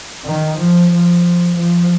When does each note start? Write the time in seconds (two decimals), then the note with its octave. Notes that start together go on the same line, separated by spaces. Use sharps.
0.25 D#3
0.57 F3
0.90 F3
1.55 F3